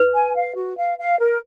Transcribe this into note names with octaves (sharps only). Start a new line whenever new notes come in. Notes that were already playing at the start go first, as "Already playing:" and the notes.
Already playing: B4
G#5
F5
F#4
F5
F5
A#4